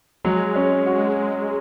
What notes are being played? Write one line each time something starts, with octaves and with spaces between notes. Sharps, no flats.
F#3 G#3
C#4
F#4